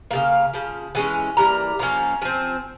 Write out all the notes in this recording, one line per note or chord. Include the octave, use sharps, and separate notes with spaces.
C#3 G3 A#3 F5
C#3 F3
E3 G#3 C#4 G#5
E3 G3 A#3 A#5
F3 A#3 C#4 A#5
F3 C4 G#5